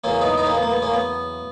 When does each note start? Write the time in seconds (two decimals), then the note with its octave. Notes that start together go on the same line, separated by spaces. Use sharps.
0.04 E2 C#3 F#3 A#3 C#4
0.21 B3 D#4
0.37 B3 D#4
0.46 A#3 C#4
0.55 B3
0.63 A#3
0.71 B3
0.82 A#3 C#4
0.94 B3